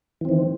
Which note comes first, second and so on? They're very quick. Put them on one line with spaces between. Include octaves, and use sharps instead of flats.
E3 C4 D#3